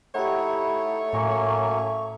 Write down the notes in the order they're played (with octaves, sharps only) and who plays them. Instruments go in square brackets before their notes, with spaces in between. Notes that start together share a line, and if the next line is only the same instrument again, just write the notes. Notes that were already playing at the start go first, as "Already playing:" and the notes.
[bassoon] A3 [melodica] D#4 E4 [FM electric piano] G4 F#5 [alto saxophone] C#5
[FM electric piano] A2 A#5 C#6 [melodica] F#3 A#3 C#4